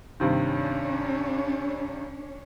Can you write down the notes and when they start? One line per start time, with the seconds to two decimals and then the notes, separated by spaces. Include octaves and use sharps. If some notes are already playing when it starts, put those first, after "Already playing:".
0.20 G2 C3 D#3 C#4 D4 C#5